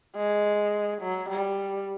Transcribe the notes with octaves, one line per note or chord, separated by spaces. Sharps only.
G#3
F#3
G3